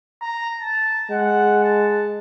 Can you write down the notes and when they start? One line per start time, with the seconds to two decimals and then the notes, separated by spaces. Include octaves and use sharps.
0.21 A#5
0.59 A5
1.11 G#3 F#5
1.64 A5